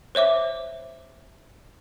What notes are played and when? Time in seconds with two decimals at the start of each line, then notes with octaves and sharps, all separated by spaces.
0.15 C5 C#5 E5 D6